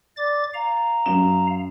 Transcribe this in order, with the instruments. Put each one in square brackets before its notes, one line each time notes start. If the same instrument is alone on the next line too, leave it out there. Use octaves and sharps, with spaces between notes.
[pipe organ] D5 D6 A6
F5 A#5
[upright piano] F#2 E7